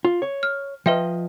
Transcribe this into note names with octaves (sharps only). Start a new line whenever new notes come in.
F4
C#5
F6
F3 B4 D#5 E5 G5